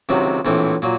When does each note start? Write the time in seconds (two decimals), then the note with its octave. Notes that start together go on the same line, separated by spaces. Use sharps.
0.09 C#2 C3 D#3 F#3
0.45 A#1 A2 E3 A3 C4
0.82 A#2 F#3